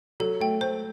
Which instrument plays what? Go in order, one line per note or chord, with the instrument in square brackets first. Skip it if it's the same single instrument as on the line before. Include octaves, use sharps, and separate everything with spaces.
[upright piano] F#3 [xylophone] A4
[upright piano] A3 [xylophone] G5
[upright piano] A3 [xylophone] C5